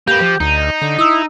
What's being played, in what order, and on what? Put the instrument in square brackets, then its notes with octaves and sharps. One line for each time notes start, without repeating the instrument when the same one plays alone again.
[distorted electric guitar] A#3 B4 [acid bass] G4 [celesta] G6
[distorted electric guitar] F3
[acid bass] D2 [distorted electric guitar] D#4
[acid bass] D3
[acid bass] E4 [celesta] D#6 E6